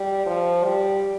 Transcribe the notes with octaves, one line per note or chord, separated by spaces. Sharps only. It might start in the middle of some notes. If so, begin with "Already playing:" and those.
Already playing: G3
F3
G3